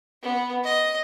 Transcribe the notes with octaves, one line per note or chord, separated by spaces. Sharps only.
B3
D#5